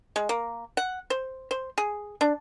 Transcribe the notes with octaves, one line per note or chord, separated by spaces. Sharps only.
G#3
A#3
F#5
C5
C5
G#4
D4